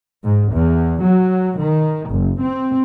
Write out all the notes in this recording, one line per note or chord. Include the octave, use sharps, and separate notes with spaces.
G#2
E2
F#3
D#3
F#1
C4